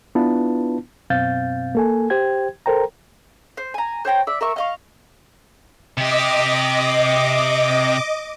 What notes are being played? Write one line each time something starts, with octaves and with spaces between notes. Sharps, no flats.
B3 D4 E4 F4 B4 A5
F#2 B2 C4 F5 G6 A6
A#3 A4 G#5
G4 C5 G5 G#6
A4 A#4 C5 G5 A#5
C5
G#5 A#5
C5 C#5 G5 A#5
D5 E5
A#4 E5 C#6
D#5 F5 C#6
C3 G4 D#5 D6